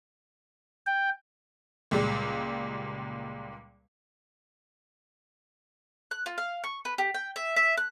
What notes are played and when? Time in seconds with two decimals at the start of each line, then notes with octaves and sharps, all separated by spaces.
0.86 G5
1.91 C#2 A#2 G3 G#3
6.11 F#6
6.26 F4
6.38 F5
6.64 C#6
6.85 B4
6.98 G4
7.14 G5
7.36 E5
7.56 E5
7.77 F#6